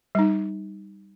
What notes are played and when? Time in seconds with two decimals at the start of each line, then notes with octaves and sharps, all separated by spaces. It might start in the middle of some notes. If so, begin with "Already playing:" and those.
0.15 G3 D#4